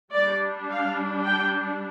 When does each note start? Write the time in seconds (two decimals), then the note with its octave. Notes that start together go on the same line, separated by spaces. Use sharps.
0.13 G3 D4 D5
0.70 F5
1.25 G5